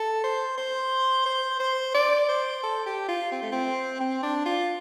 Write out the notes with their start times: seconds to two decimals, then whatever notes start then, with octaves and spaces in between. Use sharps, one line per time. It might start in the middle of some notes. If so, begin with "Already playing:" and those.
Already playing: A4
0.24 C5
0.57 C5
1.26 C5
1.60 C5
1.94 D5
2.29 C5
2.63 A4
2.86 G4
3.08 F4
3.32 C4
3.42 A3
3.52 C4
4.00 C4
4.23 D4
4.46 F4